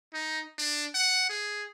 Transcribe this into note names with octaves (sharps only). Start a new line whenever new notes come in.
D#4
D4
F#5
G#4